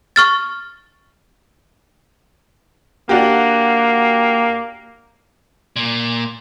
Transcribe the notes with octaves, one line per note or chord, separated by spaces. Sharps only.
C#6 F6 A6
A#3 D4 F#4 G4
A#2